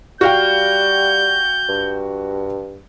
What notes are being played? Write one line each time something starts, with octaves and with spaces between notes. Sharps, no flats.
G3 F#4 F5 G5 G6
G2